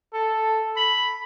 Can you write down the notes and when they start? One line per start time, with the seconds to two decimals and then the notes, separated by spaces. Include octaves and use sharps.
0.13 A4
0.77 B5